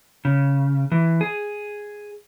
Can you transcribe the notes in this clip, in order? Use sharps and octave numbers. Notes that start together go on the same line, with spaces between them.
C#3
E3
G#4